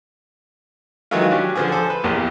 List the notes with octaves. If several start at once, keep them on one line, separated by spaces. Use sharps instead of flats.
D#3 E3 F#3 G#3 A3 F4
F#3 C#4 D4 G4
D3 F3 G#4
G#4 A4 C5
B4
A#1 E2 A#2 G4